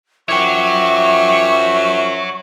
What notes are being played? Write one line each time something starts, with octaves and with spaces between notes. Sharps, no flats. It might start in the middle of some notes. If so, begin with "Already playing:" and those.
F#2 F3 C#5 E5 F#5 G5 C#6 D6